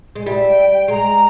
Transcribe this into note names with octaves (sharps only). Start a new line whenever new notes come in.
G#3
G3 E5
G5
G5
G#3 A#5